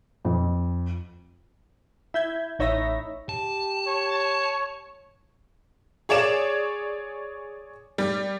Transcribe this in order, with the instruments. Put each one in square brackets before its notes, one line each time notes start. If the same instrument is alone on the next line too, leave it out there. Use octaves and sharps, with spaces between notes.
[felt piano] F2
[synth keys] E4 G6 G#6
A1 D#4 C#5 E5 B5 A#6
[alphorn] G4 [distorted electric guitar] A5
[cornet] C#5
[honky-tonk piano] G#4 C#5 D5 E7
G3